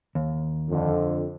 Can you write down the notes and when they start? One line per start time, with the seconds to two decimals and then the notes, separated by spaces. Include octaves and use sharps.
0.15 D#2
0.70 F2 D3